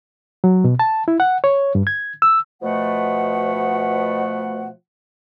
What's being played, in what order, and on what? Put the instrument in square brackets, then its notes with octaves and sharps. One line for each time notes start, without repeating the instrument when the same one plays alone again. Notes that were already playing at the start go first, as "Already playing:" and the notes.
[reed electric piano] F#3
B2
A5
E4
F#5
C#5
G2
G#6
E6
[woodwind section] B2 F3 A3 F#5